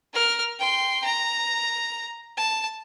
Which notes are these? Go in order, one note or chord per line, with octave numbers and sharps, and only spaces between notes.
A#4 F6
G5 C6
A#5
A5